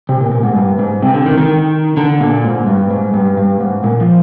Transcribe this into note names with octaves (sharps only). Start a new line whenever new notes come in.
C3
A#2
A#2
G#2
G2
G#2
C3
D3
D#3
D#3
D3
A#2
G#2
G2
G#2
G2
G2
G#2
A#2
F3